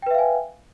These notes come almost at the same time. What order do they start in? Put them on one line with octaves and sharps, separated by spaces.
G5 B4 E5 F5 G#5